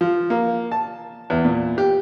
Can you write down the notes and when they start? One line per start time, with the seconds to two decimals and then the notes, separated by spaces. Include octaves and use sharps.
0.01 F3
0.30 A#3
0.72 A5
1.30 E2
1.45 A#2
1.78 G4